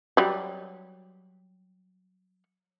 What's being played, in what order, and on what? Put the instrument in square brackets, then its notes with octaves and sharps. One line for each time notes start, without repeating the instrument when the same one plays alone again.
[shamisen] F#3 G3